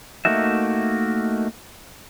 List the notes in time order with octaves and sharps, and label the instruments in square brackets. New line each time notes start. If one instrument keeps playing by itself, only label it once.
[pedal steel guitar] A3 A#3 D#4 F#4 E5